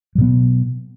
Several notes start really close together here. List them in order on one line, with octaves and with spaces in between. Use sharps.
F#3 B2 B3